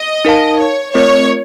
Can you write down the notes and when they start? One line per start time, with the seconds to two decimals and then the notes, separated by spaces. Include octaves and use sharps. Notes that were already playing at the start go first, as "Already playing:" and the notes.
Already playing: D#5
0.25 D#4 A#4 F5 A5
0.59 C#5
0.94 A3 C4 F4 A#4 C#5 D#5